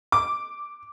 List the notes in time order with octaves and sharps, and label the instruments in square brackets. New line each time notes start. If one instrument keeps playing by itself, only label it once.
[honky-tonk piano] D6